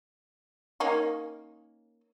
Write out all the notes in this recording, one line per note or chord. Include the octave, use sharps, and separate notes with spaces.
A#3 C#4 D#4